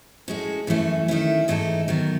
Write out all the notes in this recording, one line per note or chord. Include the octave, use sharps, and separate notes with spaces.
A2 G#3 C#4 F#4
F#2 E3 A3 C#4
D#3 A3 C#4 E4
G#2 E3 A3 D#4 A4
D#3 F#3 B3